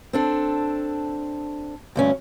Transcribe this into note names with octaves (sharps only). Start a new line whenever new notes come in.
C4 D4 A4
D2 G2 C#4